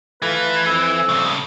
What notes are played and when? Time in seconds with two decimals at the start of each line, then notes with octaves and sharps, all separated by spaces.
0.22 E3 A3 F4 B4
0.66 F2 E6
1.09 G2 C#3
1.25 B5 D#6